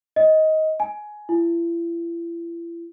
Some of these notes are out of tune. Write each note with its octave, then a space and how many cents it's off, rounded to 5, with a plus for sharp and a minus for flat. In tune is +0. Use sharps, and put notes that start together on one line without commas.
D#5 +15
G#5 +15
E4 +40